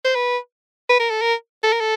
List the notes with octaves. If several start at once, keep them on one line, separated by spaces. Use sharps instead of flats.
C5
B4
B4
A#4
A4
A#4
A4
A#4
A4